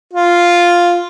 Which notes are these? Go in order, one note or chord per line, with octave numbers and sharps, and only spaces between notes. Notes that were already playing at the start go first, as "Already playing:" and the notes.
F4